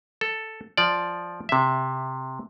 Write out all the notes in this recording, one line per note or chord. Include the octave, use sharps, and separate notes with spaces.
A4
F3 D5
C3 E5